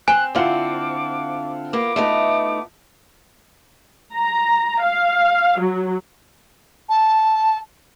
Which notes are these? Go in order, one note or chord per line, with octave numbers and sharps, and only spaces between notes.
C4 G#5 F#6 E7
D3 C4 E4 F4 F#5 D6
A#3 B3 D6
A3 B3 D#4
A#5
F5
F#3
A5